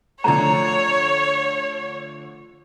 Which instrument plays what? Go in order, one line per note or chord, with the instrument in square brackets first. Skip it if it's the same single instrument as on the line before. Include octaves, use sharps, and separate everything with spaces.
[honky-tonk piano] D3 F3 A3 [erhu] C#5 [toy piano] A#5